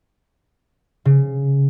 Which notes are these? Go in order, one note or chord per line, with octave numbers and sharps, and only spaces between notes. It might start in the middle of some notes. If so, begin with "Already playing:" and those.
C#3